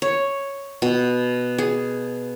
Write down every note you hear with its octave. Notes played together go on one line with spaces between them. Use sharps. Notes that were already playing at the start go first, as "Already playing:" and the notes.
C#5
B2
G#4